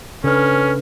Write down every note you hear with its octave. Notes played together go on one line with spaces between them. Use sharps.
C#3 C#4 D4 A4 B4 F6